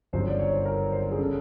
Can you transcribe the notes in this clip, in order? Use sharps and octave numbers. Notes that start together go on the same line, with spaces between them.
G1 F#2 C#3 F#3 C5
D5
C#5
C5
A#4
C5
G#4
C#3 A4